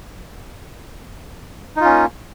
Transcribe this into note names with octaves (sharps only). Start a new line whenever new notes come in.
A#3 C#4 D#4 F4